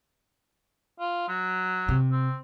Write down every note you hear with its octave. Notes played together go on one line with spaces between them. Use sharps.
F4
F#3
C3
C4